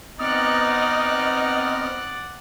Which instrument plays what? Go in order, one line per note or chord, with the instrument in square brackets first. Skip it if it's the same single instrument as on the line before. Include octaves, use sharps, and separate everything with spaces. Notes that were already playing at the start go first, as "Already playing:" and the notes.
[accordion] B3 C4 F6 [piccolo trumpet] D#4 [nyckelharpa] D5 F#5 [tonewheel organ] D#5